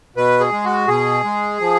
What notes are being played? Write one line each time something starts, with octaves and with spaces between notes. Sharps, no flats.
B2 B4
G#4
G#3
F#4
B2 G#4
G#3
F3